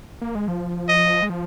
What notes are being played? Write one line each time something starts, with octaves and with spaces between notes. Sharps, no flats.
A#3
G#3
F3
D#5
G#3
F3